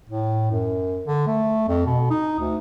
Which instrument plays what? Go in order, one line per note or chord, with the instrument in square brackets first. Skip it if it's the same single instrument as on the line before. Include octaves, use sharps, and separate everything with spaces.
[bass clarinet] A2
F#2
D3
A3
F2
B2
D#4
D2